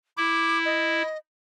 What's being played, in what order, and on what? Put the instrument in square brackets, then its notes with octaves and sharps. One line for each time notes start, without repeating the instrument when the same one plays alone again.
[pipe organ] E4 [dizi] D6
[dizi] D#5